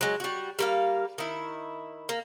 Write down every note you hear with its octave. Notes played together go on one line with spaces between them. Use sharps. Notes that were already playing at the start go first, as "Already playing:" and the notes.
F#3 G#3
G3 F#4
G3 A#3 F5
D#3 E4
A#3